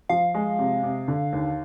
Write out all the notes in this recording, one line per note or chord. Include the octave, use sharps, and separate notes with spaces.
F3 F5
G#3
C3
C3
D3
D#2